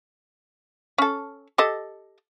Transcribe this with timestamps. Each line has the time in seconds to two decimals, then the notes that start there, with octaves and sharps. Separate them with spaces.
0.98 C#4 A4
1.58 G4 A4 D#5